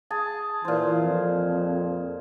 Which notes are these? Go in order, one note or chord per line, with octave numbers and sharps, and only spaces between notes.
G#4 A5
A#2 E3 C5
F2